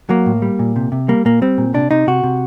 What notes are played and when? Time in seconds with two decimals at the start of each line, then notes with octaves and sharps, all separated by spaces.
0.09 F#3 A#3
0.26 A2
0.42 G3
0.59 A#2
0.76 C3
0.92 C3
1.08 G3 A#3
1.25 A#2 A#3
1.42 G3 C4
1.58 A#2
1.74 C3 D4
1.91 C3 D#4
2.07 C3 F#4
2.24 C3